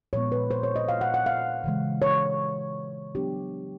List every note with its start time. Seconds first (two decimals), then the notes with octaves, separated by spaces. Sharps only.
0.13 A#2 F3 G#3 B3 C#5
0.32 B4
0.51 C5
0.63 C#5
0.76 D#5
0.89 F5
1.01 F#5
1.14 F#5
1.26 F5
1.64 C#3 E3 G#3
2.02 C#5
3.15 F#3 B3 D4 G4